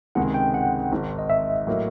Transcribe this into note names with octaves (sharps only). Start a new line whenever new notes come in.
C#2 C3 D#3 G#3 F#5
G5
F#5
G#1 G#2 D#3
D#5
E5
A2 F#3 A#3